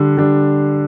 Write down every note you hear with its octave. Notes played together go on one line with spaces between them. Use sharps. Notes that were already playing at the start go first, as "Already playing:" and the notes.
Already playing: D3 G3 D4
D3 G3 D4